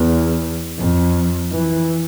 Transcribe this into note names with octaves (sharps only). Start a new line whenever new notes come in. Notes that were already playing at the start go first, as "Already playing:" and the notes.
Already playing: E2
F2
E3